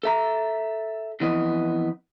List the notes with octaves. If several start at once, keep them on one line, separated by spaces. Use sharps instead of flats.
A4 E5 A#5
F2 E3 B3 D#5